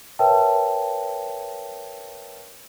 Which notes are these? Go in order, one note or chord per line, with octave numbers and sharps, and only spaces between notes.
A#4 B4 C#5 E5 G5 A5